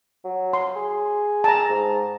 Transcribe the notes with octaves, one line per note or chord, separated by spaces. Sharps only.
F#3
C6
G#4
A5 A#5
G#2